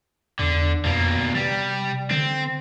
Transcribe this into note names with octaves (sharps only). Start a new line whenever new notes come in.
E2 D3
F2 B2 A#3
C3 G3
D3 C4